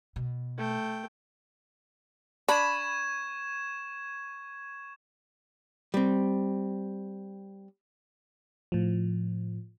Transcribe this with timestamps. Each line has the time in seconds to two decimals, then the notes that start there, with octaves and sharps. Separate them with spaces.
0.16 B2
0.58 A3 G5
2.49 D4 B5 C#6 G#6 E7
5.94 G3 C4
8.72 A2 F3